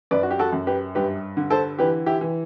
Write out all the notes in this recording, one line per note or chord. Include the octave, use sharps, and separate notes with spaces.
F#2 B4 D5
F#4
G4
F#4 A4
F#2
G4 B4
G2 G4 B4
D3
A4 C5
E3 G4 B4
E4 G4
E3